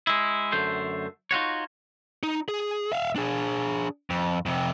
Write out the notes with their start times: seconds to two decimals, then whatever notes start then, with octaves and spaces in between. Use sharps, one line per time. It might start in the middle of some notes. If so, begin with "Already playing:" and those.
0.07 G#3 E4
0.52 F#2 D3 A3 C5
1.31 D#4 F4 F#4 C#5
2.23 D#4
2.49 G#4
2.92 E5 F5
3.16 D4 G#4
4.10 F2
4.46 F2 C3